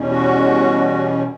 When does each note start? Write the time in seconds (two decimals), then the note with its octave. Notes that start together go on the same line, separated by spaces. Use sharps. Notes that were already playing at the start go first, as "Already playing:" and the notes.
Already playing: E2 B2 G3 C#4
0.10 F#4